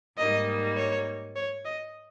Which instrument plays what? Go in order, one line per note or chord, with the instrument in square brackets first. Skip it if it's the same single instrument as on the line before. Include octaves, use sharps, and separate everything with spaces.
[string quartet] G#2 G3 A#3 D#4 [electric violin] D#5
[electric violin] C#5
C#5
D#5